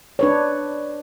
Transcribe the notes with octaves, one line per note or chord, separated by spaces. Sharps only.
D4 B4 C#5